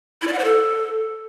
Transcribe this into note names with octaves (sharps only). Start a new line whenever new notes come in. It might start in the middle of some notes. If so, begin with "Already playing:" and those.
E4
D5
F#5
C5
A4